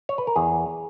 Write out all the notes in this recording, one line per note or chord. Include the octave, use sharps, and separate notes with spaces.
C#5
B4
A#4
E2 G#4